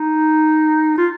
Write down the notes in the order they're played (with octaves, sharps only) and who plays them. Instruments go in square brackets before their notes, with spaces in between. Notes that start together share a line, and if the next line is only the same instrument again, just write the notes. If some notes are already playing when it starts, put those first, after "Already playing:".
Already playing: [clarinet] D#4
F4